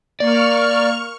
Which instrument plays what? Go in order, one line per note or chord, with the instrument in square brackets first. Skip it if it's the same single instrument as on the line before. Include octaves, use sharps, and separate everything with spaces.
[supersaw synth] A#3 [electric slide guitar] D5 [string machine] C#6 F6